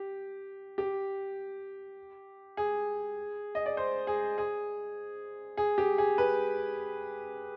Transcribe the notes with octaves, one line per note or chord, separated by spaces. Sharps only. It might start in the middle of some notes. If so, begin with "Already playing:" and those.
Already playing: G4
G4
G#4
D#5
D5
C5
G#4
G#4
G#4
G4
G#4
B4